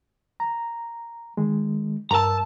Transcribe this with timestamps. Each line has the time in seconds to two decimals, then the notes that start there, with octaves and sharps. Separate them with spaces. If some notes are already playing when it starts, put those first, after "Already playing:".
0.40 A#5
1.37 D#3 G#3
2.11 G2 A#4 A5 A#5 E6